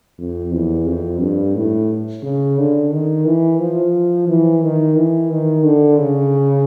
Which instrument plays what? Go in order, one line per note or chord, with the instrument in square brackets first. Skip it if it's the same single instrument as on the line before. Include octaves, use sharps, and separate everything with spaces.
[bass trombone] F2
E2
F2
G2
A2
C#3
D3
D#3
E3
F3
E3
D#3
E3
D#3
D3
C#3